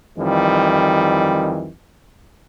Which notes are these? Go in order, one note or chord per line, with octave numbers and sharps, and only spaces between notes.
F2 D#3 E3 G3